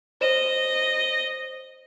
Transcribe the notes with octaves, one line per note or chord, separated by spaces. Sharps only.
C5 C#5 D#5 E7